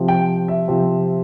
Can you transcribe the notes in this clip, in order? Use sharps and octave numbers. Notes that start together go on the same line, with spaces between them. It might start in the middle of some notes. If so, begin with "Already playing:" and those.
Already playing: C3 F3 C4 F4
G5
E5
C3 F3 C4 F4